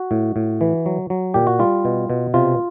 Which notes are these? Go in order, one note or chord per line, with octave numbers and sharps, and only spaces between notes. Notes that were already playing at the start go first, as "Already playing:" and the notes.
Already playing: F#4
A2
A2
E3
F#3
F#3
A#2 G4
F#4
G3 F4
B2
B2
C3 F4